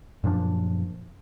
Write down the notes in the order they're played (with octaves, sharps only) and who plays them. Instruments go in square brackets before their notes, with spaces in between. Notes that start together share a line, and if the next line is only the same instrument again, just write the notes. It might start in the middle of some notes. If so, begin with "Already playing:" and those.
[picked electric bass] F#2 A#2 F3 D4